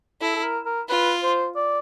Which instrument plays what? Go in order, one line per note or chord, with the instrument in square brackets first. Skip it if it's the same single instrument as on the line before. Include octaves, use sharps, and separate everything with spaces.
[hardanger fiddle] E4 [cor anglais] A4
[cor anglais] A4
A#4
A#4
[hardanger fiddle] F4 [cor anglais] B4
[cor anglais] C5
D5